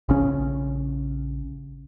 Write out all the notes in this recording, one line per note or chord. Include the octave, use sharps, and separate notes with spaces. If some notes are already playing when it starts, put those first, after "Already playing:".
A#1 C#3 C#4